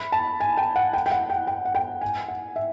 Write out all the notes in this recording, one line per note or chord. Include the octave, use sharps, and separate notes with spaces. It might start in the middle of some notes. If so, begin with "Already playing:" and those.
Already playing: B5
A5
G#5
G5
F#5
G5
G5
F#5
G5
G5
F#5
G5
G#5
F#5
E5